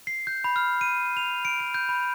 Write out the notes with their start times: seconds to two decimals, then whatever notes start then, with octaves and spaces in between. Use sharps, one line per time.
0.07 C7
0.27 G6
0.44 B5
0.56 F6
0.81 D#7
1.17 F7
1.45 D7
1.60 D7
1.74 G6
1.89 B5